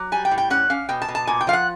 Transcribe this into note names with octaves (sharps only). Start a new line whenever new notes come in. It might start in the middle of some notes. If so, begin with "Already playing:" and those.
Already playing: F#3
G3 G#5
G5
A2
G5
C#4 F#5
C#4 F5
B2 G5
A5
B2
A5
A#2 G#5
G5
F3 F5
F#5